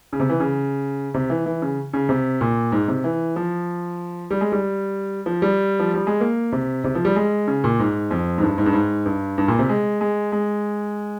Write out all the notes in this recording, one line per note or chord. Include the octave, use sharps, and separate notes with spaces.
C#3
C3
E3
C#3
C3
E3
E3
C#3
C#3
C3
A#2
G#2
C3
E3
F3
G3
G#3
G3
F3
G3
F3
G3
G#3
A#3
C3
C3
F3
G3
G#3
C#3
A#2
G#2
F2
G#2
G2
G#2
G2
G#2
G2
G2
A#2
C3
G#3
G#3
G#3